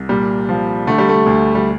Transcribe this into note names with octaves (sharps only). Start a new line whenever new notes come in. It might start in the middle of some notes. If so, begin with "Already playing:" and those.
Already playing: C2
A#2 G3
F3
D3 A3
G3
A3
D2
G3